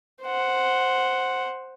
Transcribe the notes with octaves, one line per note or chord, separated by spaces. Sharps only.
C5 F#5